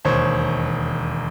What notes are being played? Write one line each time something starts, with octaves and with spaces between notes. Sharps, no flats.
E1 D#2 C5 C#5